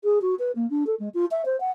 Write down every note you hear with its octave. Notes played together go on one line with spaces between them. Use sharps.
G#4
F#4
B4
A#3
D4
A4
G#3
F4
E5
C5
F#5